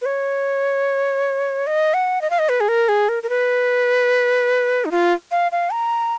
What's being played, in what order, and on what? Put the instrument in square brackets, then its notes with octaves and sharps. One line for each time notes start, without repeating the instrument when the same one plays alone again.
[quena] B4
C#5
D#5
F#5
D#5
F5
D#5
B4
G#4
A#4
G#4
A#4
A#4
B4
D#4
F4
F5
F5
A#5